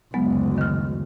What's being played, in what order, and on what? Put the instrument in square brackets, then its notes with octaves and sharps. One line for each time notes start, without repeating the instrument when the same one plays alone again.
[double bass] F#1 D2 [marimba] F#3 G#3 B3
[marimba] D#3 F6